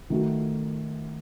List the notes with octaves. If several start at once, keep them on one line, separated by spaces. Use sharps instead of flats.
D#3 A3 D#4 F#4